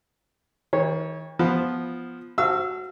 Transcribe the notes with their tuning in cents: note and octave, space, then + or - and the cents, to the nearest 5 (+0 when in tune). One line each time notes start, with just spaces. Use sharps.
D#3 +45 C#5 -10
F3 +0 B3 +0 F4 +0
F#4 +0 F5 -40 E6 +0